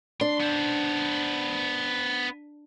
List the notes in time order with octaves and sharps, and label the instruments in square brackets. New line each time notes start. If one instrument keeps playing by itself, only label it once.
[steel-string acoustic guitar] D4 [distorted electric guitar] C6
[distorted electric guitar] B3 C5